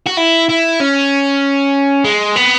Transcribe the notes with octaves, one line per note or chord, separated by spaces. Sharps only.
F#4
E4
E4
C#4
G#3
B3